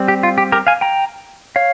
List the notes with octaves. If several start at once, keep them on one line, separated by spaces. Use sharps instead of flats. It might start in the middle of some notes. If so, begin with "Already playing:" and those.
Already playing: G3 C4
G4
F4
G4
G4 A#4
F5 G#5
G5 A#5
C#5 F5